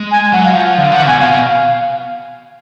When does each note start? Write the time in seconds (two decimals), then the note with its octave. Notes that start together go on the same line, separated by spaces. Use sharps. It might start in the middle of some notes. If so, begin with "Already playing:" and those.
Already playing: G#3
0.11 G#5
0.33 F#3 F#5
0.44 F5
0.55 F3 F#5
0.66 F#5
0.77 D3 F5
0.91 F3 F#5
1.07 B2 G#5
1.21 B2 F5
1.32 B2